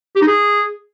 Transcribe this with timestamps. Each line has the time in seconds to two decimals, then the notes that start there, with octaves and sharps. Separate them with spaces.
0.16 G4
0.22 D#4
0.27 G#4